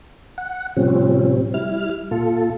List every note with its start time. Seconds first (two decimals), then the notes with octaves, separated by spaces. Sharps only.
0.38 F#5
0.76 A2 C3 F3 G3 C4 C#4
1.54 G3 E4 F6
2.11 A#2 F4 A4